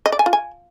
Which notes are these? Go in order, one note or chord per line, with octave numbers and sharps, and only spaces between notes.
D#5
D5
G#5
F4
G#5